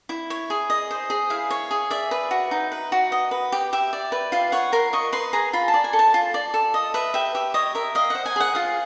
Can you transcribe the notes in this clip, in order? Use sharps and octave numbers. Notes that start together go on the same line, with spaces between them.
E4
C#5
G#4
D#5
C5
G#4
E4 F5
C#5
G#4
D5 E5
B4
F#4
D#4
B4
F#4
D#5
B4
G4
G4 E5
D5
B4
F4 F5
C#5 F#5
A#4 C6
D#5 C#6
B4 C6
G#4 A#5
F4 B5
A5
D5
G#5
A4
A5
F4
D5
A4
D#5
B4 E5
G4 E5
G4 E5
C#5 D#5
A#4 E5
D#5 F5
C5 F#5
G#5
G#4 F#5
F4 F5